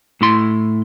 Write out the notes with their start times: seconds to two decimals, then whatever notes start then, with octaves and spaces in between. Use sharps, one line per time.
0.21 A2 E4 C6